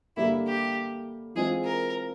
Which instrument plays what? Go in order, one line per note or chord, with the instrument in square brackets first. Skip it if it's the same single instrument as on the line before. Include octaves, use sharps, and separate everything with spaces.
[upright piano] D3 G3 A#3 [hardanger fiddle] E4
[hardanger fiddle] G4
[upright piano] E3 G#3 C4 F4 [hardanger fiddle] G#4
[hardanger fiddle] A#4